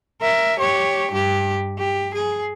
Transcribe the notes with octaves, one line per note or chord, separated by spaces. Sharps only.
A#4 E5
G4 C#5
G2 G4
G4
G#4